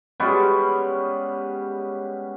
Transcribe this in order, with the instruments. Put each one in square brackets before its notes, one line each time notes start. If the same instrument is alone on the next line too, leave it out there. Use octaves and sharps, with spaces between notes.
[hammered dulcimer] G3 G#3 B3 C#4